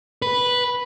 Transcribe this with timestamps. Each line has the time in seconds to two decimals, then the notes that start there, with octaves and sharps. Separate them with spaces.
0.22 B4